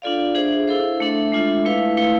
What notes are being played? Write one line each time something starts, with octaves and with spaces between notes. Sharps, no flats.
D4 F4 A4 D5 F5
D4 G#4 C5 E5
E4 A4 C5 F5
A3 D4 A4 E5
G#3 D4 F4 A4 E5
A3 E4 B4 F5
A3 E4 B4 F5